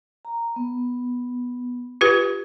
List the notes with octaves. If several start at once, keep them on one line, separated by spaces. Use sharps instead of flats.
A#5
B3
F4 G4 B4